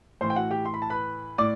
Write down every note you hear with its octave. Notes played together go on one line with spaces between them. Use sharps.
A2 E3 C5 C6
G5
F#4 F#5
G4 G5
C6
B5
A5
B4 B5
A2 D5 D6